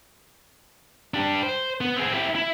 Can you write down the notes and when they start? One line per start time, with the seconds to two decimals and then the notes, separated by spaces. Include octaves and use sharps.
1.14 D4 G4
1.43 C5
1.81 B3
1.96 C4 G#4
2.13 E4 G4
2.35 E4